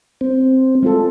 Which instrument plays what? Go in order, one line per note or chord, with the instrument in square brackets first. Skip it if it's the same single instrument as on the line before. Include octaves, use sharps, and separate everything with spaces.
[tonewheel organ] C4
[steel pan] G#3 F4 A4